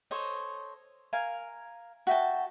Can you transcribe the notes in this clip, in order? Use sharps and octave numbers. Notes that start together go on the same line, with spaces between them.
A4 C5 C#5 D#5
A#4 F5 G#5
F#4 E5 G5 A5